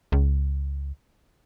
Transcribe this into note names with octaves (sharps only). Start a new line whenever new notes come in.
C#2